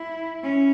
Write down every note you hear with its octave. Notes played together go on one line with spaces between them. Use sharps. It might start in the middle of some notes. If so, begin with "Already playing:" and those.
Already playing: E4
C#4